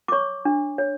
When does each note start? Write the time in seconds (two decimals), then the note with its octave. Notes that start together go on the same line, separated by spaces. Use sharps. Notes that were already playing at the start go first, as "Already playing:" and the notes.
0.08 D6
0.12 C#5 C#6
0.45 D4
0.78 C#5